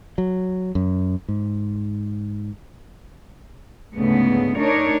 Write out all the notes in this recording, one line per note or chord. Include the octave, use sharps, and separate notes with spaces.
F#3
F#2
G#2
D2 G#2 C#3 A3 B3
A3 D4 D#4 A#4 C#5